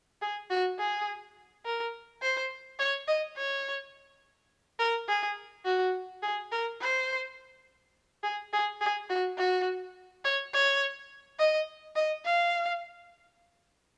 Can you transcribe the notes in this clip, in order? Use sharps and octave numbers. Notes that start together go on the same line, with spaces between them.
G#4
F#4
G#4
A#4
C5
C#5
D#5
C#5
A#4
G#4
F#4
G#4
A#4
C5
G#4
G#4
G#4
F#4
F#4
C#5
C#5
D#5
D#5
F5